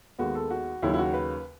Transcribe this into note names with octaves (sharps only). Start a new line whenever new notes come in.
D#2 D#3 G#3 B3 F#4
A4
F#4
D#2 C#3 F#3 E4
E4
F#4
B4